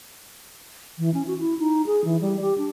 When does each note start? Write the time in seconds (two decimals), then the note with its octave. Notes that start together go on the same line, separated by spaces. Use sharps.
0.98 E3
1.14 C#4
1.27 F#4
1.39 E4
1.59 D#4
1.86 G#4
2.04 E3
2.21 G3
2.41 G4
2.58 D4